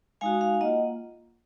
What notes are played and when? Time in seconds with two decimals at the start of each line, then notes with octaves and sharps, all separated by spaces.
0.21 G#3 D#4 F#4 F5 G#5
0.41 F5 G#5
0.61 A#3 F4 D#5 F#5